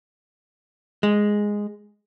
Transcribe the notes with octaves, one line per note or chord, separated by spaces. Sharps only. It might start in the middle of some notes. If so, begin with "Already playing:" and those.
G#3